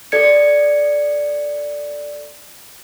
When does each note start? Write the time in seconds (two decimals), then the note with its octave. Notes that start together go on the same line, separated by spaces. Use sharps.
0.12 A4 D5 G#6 C#7